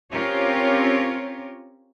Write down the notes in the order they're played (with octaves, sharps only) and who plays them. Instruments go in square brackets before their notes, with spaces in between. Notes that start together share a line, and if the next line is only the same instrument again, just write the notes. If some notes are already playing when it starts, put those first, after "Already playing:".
[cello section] C4 C#4 F4 G4 A#4 C#5